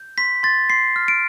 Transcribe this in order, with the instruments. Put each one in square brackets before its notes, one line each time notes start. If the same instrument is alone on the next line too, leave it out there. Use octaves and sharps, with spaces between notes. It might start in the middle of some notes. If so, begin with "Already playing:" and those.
Already playing: [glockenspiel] G6
C6 B6
C6 A6
C6 C7
F6
D7